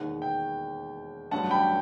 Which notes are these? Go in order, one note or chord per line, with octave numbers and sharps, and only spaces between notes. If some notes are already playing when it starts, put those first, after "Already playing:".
Already playing: E1 D#2 D#3 F#5
G5
A1 G2 F#3 F#5 A5
G5 B5